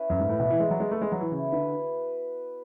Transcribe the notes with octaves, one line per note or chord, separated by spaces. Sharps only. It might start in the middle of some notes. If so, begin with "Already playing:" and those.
Already playing: C#4 E4 B4
F#2 A3
G#2
A2 E4 B4 D5
B2
E3 B3
G#3
F#3 D4 G#4 D5
G#3
A3 B3
G#3
F#3 F#4 C#5
E3
C#3 E4
D3 B4 E5